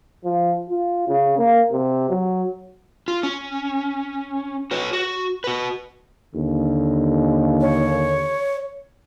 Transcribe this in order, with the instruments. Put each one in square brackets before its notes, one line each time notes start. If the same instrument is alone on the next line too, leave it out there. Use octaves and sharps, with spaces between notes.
[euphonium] F3
F4
C#3
A#3
C3
F#3
[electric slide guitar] F4
C#4
F#4 B4 C#5
F#4
F#4 B4
[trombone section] D#2 D3
[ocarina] C#5